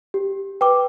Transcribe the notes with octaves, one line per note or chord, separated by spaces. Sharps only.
G4
B4 G5 D6